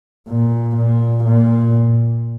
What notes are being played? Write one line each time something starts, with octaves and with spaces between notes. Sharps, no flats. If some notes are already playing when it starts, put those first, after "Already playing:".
A#2
A#2
A#2